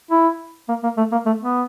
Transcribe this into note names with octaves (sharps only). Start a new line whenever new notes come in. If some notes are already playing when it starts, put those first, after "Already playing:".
E4
A#3
A#3
A3
A#3
A3
B3